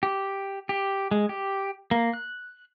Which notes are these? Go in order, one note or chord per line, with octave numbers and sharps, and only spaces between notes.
G4
G4
G#3
G4
A#3
F#6